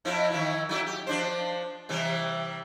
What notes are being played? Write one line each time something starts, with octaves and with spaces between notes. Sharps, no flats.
F2 F3 E4
D#3 F3 E4
F#3 E4 A4
G4
F3 D4 C5
C3 E3 G3